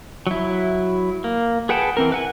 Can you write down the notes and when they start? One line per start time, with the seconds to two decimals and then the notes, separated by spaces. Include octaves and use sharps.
0.27 F#3 E4
1.24 A#3
1.69 G#4 B4 F#5 G5 A5
1.97 E3 C4 A#4
2.12 B4 F#5 G#5